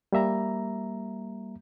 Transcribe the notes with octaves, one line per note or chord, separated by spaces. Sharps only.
G3 A#3 E5 A#5